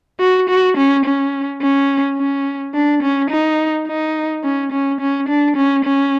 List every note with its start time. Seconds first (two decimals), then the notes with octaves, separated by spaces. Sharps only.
0.20 F#4
0.49 F#4
0.77 C#4
1.05 C#4
1.61 C#4
2.18 C#4
2.74 D4
3.02 C#4
3.30 D#4
3.87 D#4
4.44 C#4
4.72 C#4
5.01 C#4
5.28 D4
5.57 C#4
5.84 C#4